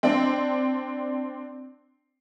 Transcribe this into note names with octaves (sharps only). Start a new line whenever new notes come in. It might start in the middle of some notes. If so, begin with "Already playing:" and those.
C4 D4